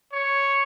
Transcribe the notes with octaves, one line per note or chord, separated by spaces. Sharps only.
C#5